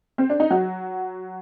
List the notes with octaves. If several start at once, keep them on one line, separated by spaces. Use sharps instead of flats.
C4
D4
D#4
F#3 F#4